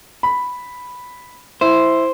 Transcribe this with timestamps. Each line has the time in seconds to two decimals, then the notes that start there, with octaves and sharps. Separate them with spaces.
0.23 B5
1.61 E4 C5